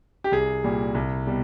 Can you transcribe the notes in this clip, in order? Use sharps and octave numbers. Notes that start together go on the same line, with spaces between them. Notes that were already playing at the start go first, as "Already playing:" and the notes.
G4
C2 G#4
A#2 G3
C2
B2 G3